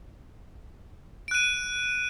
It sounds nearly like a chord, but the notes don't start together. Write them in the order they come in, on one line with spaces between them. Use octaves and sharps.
D7 F#6 D#7